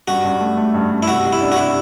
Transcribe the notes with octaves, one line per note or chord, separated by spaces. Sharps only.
G2 F#4
G2
A3
A3
G2
G2
E4
C3 F#4
G3
E4
D4
F#4
C3 E4